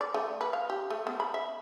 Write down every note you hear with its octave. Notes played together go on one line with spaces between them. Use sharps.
D5
A3
B4
F5
G4
A3
B3
B5
E5